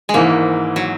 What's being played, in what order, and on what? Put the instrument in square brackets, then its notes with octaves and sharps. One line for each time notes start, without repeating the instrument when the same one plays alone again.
[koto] G#3
[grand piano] G#1 G#2 E3 [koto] A#3
[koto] F#3